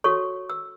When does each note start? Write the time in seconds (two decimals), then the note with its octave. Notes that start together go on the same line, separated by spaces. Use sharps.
0.04 F#4 A4 C#5 C#6
0.50 E6